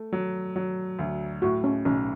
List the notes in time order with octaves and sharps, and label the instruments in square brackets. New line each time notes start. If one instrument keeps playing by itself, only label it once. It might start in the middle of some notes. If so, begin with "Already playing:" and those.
Already playing: [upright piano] A3
F#3
F#3
D2
[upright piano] A2 [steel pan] F#4
[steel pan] C#4
[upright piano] B1 [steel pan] C#4